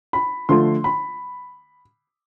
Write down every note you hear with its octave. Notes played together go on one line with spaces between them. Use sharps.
B5
D3 F3 A3 C6
B5